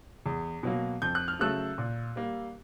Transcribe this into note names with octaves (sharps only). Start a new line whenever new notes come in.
E2
B2 F#3 A#3
F2 G6
F#6
F6
C#3 F#3 A3 E6 F#6
A#2
G3 A#3